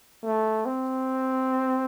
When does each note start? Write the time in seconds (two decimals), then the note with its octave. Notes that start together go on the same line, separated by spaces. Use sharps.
0.24 A3
0.66 C4